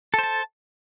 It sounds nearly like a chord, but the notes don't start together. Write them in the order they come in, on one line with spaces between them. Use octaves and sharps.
A4 C5 A5